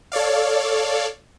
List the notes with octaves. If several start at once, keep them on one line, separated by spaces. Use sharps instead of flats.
A4 C#5 D5 F5